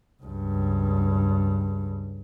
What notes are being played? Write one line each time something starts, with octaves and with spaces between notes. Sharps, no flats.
C#2 G2